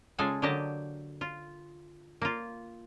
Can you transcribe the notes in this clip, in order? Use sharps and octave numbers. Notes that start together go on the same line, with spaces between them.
C#3 G#3 F4 G#4 A4 G#5
D3 F#3 A#3 G4 D#5 A5
F4
A#3 F4